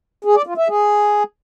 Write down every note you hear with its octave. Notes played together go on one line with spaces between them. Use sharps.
G#4
D5
F4
E5
G#4